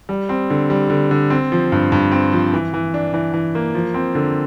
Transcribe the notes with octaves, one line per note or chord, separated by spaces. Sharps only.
G3
C4
D3
G3
D3
D3
C4
F3
G2
G2
C4
F3
E3
E3
D4
E3
E3
A#3
F3
C4
D3